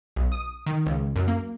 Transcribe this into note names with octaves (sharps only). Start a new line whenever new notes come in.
B1
D#6
D#3
C#2
F#2
A#3